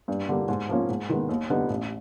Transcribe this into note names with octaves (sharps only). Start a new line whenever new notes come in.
G2
D3 G3 A#3
G#2
F3 A#3 C#4 F4
G#2
D#3 G#3 B3
D#2
D3 G3 B3 D#4
A1